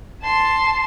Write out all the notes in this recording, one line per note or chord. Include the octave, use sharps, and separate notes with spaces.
A5 C6